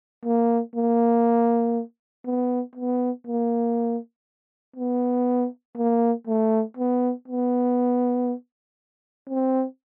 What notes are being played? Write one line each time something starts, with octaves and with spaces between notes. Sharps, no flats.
A#3
A#3
B3
B3
A#3
B3
A#3
A3
B3
B3
C4